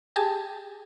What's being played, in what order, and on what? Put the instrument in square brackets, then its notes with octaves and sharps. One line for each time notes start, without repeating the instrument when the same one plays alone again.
[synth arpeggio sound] G4 G#4 G#5 A5